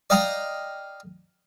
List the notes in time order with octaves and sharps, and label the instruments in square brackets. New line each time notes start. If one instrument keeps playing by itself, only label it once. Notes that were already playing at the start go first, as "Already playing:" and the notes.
[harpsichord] D5 D#5 F5 G5 A#5 D#6